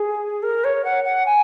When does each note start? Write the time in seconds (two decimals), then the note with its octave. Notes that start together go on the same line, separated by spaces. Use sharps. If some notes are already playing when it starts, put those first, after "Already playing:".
Already playing: G#4
0.42 A#4
0.64 C#5
0.84 F#5
1.04 F#5
1.26 G#5